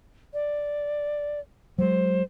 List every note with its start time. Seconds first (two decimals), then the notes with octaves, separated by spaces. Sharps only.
0.34 D5
1.78 F#3 G#3 C5